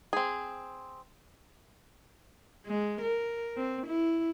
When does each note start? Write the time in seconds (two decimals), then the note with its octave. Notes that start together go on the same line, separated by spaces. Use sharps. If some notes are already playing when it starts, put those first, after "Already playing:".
0.13 C4 G#4
2.66 G#3
3.01 A#4
3.57 C4
3.87 E4